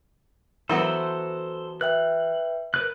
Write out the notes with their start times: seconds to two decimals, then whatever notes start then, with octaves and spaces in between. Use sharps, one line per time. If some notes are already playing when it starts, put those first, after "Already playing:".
0.69 E3 F#3 B3 A4 C5
1.81 B4 E5 G5 F#6
2.74 A#4 B4 F#6